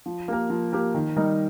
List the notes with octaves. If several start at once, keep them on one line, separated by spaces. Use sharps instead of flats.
F3
A#3 G4 A#4
F3
A#3 G4 A#4
D#3
G3 D#4 A#4 D#5